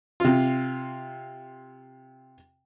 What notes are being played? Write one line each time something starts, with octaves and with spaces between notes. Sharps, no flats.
C3 F4